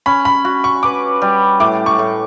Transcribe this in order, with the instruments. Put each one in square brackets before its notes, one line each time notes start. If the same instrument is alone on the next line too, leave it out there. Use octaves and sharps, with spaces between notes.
[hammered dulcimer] C#4 [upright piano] B5
[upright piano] B5
[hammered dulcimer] F#4
[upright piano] C#6
[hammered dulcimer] B4 [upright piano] D6
[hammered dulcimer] G3
[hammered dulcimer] A2 [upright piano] D6
[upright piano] C#6
[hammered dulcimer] A2